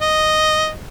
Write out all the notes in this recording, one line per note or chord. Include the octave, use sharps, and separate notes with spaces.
D#5